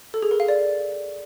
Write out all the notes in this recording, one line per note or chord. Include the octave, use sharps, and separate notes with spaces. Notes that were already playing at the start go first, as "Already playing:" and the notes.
A4
G#4
A#4
F5
D5